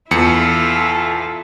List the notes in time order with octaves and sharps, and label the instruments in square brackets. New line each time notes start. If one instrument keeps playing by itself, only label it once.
[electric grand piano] E2 C#7 [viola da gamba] E4 F4 A4